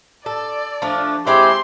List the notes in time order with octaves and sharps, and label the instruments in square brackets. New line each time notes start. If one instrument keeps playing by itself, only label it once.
[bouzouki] A4 [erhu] D5
[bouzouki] F3 A3 D4
[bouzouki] G#3 C4 E4 [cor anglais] G4 [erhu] C6